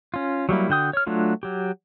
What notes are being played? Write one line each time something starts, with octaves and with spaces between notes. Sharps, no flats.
C#4 F4
F#3 G3 A#3 E4
D3 F#4 G5 D#6
C#5 F6
F#3 A3 D4 F4
F#3 G4